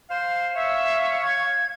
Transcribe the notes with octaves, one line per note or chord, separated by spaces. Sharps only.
C5 F5
C#5 E5
G#6